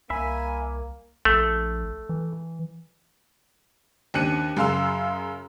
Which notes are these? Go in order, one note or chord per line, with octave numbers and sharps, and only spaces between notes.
C2 A#3 E5 G#5 B5
A#1 A3
E3
D#2 C4 D4 F#6 C#7 D#7
F#2 C#3 F5 C6 E6